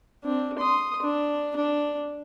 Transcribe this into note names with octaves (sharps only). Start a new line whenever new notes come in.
C4 D4
C6 D#6
D4
D4